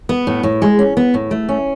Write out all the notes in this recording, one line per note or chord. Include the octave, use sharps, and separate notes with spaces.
B3
A2
A2
G#3
C#4
B3
A2
A3
C#4